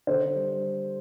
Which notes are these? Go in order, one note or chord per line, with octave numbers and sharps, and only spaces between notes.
D3 C5
G3